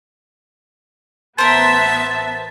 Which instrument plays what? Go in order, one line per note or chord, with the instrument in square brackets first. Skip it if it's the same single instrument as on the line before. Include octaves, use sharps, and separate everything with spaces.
[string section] A1 B3 E5 [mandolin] A#4 C5 [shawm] A5